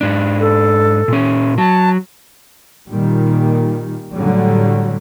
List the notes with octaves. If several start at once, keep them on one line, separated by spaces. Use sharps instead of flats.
G#2 D4
A4
A#2 C#4
F#3 A5
A#2 D#3 G3
A2 D3 F#3 G3